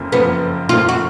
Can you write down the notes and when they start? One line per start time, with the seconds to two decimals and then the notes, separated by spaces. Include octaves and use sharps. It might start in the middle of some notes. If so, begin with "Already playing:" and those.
Already playing: F#1 F2 F3 A#3
0.12 F#1 F2 F3 A#3 B3
0.69 F#1 F2 F3 A#3 F4
0.89 F#4